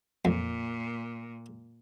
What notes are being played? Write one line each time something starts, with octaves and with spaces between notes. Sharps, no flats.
F2 A#2